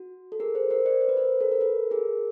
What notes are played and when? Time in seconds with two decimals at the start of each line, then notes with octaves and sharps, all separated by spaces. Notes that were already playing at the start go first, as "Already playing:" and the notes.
Already playing: F#4
0.32 A4
0.40 G#4 A#4
0.55 A#4 C5
0.70 A#4 C5
0.86 C5 D5
1.01 C5
1.09 B4
1.17 A#4 C5
1.41 A4
1.52 A#4
1.61 A4 B4
1.91 G#4 A#4